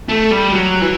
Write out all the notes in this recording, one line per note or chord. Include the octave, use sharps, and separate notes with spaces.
A3
G3
F#3
E3